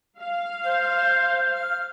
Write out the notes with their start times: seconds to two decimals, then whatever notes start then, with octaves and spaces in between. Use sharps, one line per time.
0.19 F5
0.63 C5
1.53 F6